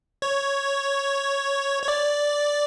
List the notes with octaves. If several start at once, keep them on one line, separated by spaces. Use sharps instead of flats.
C#5
C#5
D5